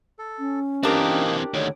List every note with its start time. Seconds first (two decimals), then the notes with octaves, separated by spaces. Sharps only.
0.19 A4
0.39 C#4
0.83 E3 A#3 C4 D4 D#4 G4 A#4
1.54 D2 D3 D#3 C#5